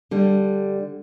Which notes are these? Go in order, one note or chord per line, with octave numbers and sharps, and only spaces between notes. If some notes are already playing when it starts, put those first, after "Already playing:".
D3 G3